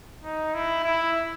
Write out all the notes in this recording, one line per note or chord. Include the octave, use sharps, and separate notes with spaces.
D#4
E4
E4